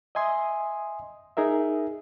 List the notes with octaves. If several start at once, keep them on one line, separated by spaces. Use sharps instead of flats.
D#5 E5 G#5 C6 D#6
D#4 G#4 A#4 E5